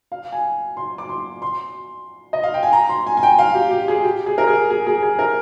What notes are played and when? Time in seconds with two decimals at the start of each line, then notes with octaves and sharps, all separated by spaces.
0.12 F5
0.32 G#5
0.77 C6
0.98 D6
1.09 C6
1.42 C6
2.33 D#5
2.43 F5
2.54 G5
2.63 G#5
2.73 A#5
2.89 C6
3.07 G#5
3.17 G#5
3.23 G5
3.39 F5
3.54 G4
3.71 G4
3.88 G#4
4.04 G4
4.26 G#4
4.38 A#4
4.48 G#4
4.70 G#4
4.87 G#4
5.03 G#4
5.19 A#4